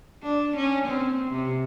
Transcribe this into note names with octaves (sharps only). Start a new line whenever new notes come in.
D4
C#4
C4
C3